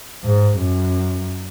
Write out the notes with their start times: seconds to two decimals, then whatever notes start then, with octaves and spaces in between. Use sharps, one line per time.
0.24 G#2
0.58 F#2